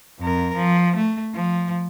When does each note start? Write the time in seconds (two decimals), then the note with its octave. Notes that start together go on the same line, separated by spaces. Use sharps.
0.20 F2 A#4
0.55 F3
0.96 A3
1.34 F3